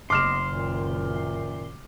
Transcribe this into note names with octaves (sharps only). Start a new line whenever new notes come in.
F#1 B3 D#5 C6 D6 F6 E7
F#2 A#2 D#3